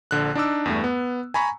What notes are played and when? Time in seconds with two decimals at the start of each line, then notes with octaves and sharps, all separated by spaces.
0.11 A#1 D3 F#6
0.35 D4 D#4 D6 E6
0.65 E2 G2 A3
0.84 B3
1.34 G#5 A#5 B5 C#6